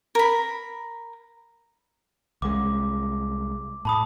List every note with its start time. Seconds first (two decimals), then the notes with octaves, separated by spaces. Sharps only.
0.15 A#4 B5
2.42 C2 G#3 D6
3.85 A2 A5 B5 D#6